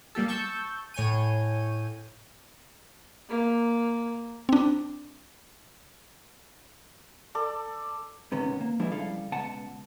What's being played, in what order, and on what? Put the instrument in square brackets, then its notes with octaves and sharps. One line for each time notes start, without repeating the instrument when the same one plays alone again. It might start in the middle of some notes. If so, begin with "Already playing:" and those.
[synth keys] G3 A#3 G4 A4
A5 C#6 E6 G6
A2 C#5 G#5 G6 D#7
[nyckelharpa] A#3
[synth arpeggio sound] C4 D4
[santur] A4 D5
[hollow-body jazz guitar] G#2 C3 D#3 B3 C#4
A#3
F3 G3 G#3 B3 D4 E4
F2 C#3 G3 E4 A4 F5
C#2 B2 F#5 A5